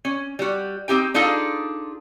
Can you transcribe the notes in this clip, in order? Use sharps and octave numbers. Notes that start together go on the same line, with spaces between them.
C#4
G3 F#4
C4 D#4 G4 G5
D4 D#4 F4 G#4 A4